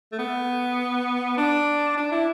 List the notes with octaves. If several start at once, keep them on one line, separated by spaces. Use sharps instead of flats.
A3
B3
D4
D4
E4